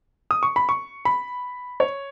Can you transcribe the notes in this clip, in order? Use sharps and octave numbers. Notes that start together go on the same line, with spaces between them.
D#6
C#6
B5
C#6
B5
C#5